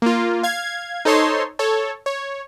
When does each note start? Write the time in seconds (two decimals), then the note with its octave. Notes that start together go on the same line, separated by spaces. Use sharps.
0.02 A#3 F4
0.43 F5 G#6
1.05 D#4 A4 C5 C#5 A5 C6
1.59 A4 C#5
2.06 C#5